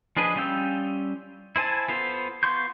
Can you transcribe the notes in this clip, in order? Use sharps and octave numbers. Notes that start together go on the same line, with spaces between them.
F3 D4 G#4 B4 D#5
G3 C#4 F4 G5 E6
E4 C5 G#5 A5
B3 F4 A4 C5
B3 F4 C6 C#6 G6